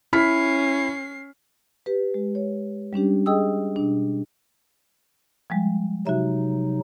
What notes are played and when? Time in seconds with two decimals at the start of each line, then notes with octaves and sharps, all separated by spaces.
0.13 C#4 E4 F6 B6 C7
1.86 G4 B4
2.14 G#3
2.35 C#5
2.93 G3 C#4 D4 G4
3.26 G#4 D#5 G5 D#6 E6
3.76 B2 D4
5.50 F3 G3 G#3
6.07 C3 F#3 D#4 F#4 E5